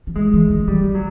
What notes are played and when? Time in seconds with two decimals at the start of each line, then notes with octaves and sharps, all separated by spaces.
0.07 F3
0.16 E3 G#3
0.34 E3
0.50 D#3
0.60 F3
0.68 E3 G3
0.85 F3
0.95 F#3